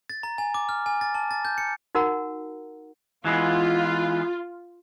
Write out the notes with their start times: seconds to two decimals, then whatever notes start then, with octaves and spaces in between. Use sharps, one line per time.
0.09 A6
0.23 A#5
0.38 G#5
0.54 D6
0.69 F6
0.86 G#5
1.01 A6
1.15 A5
1.31 A6
1.45 G6
1.58 C#7
1.95 D#4 F#4 A#4 F#5 A#5
3.25 E3 G#3 B3 F4